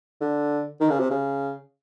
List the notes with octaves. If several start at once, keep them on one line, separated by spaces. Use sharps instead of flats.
D3
D#3
C#3
C3
C#3